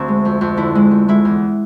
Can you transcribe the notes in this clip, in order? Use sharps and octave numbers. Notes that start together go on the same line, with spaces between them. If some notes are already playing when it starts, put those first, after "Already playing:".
Already playing: D2 C4 D4
G#3
F2
F2
D3 E4
G#3
F2
G#3 E4
E2